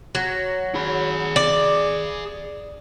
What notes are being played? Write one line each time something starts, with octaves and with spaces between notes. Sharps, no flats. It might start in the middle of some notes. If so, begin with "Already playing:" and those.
F#3
G#4 B5
D5